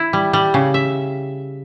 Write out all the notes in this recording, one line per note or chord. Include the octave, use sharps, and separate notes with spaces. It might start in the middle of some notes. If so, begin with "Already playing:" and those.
Already playing: E4
G3
G3
C#3
E5